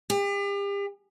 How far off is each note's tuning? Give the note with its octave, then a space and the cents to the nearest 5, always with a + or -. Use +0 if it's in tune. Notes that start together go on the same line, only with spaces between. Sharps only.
G4 +40